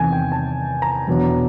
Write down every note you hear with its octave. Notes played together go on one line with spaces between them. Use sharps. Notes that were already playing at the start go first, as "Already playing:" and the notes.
Already playing: E2 C3 D#3 G#5
G5
A5
A#5
E2 B2 F#3 B3 D4